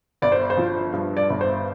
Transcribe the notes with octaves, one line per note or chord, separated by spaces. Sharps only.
G1 D5
C5
C5
F3
G2
D5
G1
C5